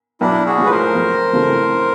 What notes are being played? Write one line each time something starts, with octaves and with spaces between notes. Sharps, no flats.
B1 D4 E4
F#4 G#4
A2 F3 G#3
B4
A#4 C5
F2
C#3 E3 A3 C4